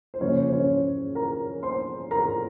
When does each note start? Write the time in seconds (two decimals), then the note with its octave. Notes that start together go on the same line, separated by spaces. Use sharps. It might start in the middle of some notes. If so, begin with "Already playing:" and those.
0.14 C5
0.20 F2 C#3 F3 A#3 C#4 C#5
0.48 C5
0.53 C#4 C#5
1.15 A#4 A#5
1.63 C5 C6
2.11 A#4 A#5